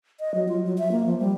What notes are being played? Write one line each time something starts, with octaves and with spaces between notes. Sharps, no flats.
D#5
F#3
F4
F#3
E5
A#3
F3
G3